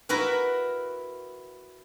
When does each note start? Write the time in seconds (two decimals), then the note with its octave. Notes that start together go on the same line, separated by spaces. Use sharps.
0.09 E4 F#4 A#4 B4